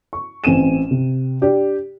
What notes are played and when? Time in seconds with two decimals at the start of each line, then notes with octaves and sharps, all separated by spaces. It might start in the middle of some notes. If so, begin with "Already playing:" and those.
0.13 C#6
0.44 A1 C4 G#5 D#7 E7
0.91 C3
1.42 D4 G4